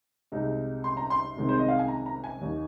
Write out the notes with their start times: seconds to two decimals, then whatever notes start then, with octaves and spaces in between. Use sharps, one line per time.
0.32 C2 C3 G#3 D#4
0.84 C6
0.97 A#5
1.10 C6
1.36 C2 C3 D#3 G#3 C4
1.49 C5
1.59 D#5
1.68 F5
1.79 G#5
1.88 A#5
2.06 A#5
2.24 G#5
2.41 D#2 D#3 A#3 D#4